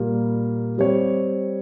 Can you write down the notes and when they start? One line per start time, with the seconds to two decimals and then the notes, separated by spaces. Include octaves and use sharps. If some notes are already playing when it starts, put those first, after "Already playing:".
Already playing: A#2 G3 A#3
0.78 G3 C4 G4 C#5